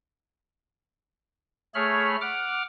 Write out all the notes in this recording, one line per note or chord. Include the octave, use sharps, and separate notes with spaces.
A3 G#4 C#5 B5 F6
F#5 D6 F6